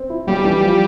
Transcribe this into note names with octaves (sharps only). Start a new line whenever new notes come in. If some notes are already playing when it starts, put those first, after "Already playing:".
Already playing: C4
E4
B1 G3
E3
F3